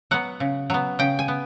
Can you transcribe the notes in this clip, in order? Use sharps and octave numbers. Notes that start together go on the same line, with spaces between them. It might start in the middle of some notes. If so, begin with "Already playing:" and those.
F#3 B3 F#5
C#3
F#3 B3
C#3 G5
G#5
B3